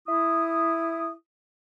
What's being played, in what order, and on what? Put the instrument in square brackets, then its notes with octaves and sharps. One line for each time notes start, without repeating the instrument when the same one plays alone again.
[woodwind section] E4 D#6